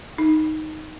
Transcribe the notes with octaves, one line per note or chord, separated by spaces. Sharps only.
D#4